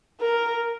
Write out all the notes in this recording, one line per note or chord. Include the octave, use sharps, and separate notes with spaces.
A#4